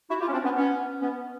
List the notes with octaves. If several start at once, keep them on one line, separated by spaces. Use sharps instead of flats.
E4 F#4
F4 G4
C#4
C4 D4
B3 C#4
B3 C#4
B3 C#4